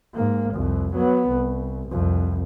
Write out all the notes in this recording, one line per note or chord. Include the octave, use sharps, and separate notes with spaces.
G#2 A#3
C2 F2
F#3 B3
C2
C2 F2